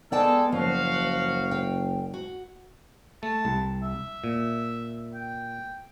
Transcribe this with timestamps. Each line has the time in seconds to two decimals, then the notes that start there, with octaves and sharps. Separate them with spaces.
0.12 G#3 B3 A4 D5 G5 A5
0.52 F#1 F3 F#4 F5
1.51 G5
2.14 F#4
3.23 A3 A5
3.45 C2
3.83 E5
4.24 A#2
5.14 G5